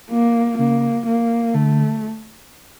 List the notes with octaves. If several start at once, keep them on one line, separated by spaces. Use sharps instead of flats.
A#3
C#3 A#3
A#3
D3 A3